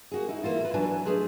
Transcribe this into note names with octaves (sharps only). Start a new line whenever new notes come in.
A#3 F#4 G#4
D#4 E4
E3 A#3 E4 F4
A4 B4
E3 F#3 D4 B4 G#5 A5
G#3 A3 G#4